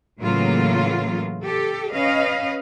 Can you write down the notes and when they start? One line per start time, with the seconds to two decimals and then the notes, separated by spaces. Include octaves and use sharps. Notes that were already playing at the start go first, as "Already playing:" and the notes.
0.20 A2 C#3 E3 F#3 A#3 F4
1.42 G4 A4
1.91 C#4 B4 D#5 F5